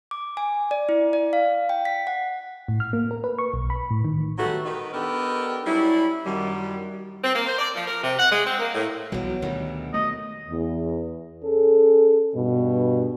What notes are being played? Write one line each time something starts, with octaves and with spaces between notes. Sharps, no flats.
D6
G#5
D5
E4
D5
F5
G5
B6
F#5
A2
F6
A#3
A#4
B4
C#6
B1
B5
A2
D#3
F#3 G3 A3 B3 F#4
D#3 B4
B3 D4 D#4 G4 A4 A#4
F#3 G3 C#4 D4 E4
F#2 D#3 G3
C4
A#3
C5
D5
F3
A#4
C3
F#5
G#3
C4
A#3
A2
B1 B2 E3 F#3 G3
D2 D#3 G3 D#4
A3 D#5
E2
C#4 G#4 A4
G2 B2